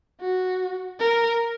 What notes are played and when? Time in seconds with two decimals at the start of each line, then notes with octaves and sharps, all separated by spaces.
0.21 F#4
1.00 A#4